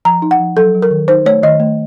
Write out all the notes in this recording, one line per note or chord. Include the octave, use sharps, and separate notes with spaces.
F3 A#5
D#4
F#5
F3
F#3 A4
F#3
A#4
D#3
D#4 C5
A3 C#5
D#3 D#5
A3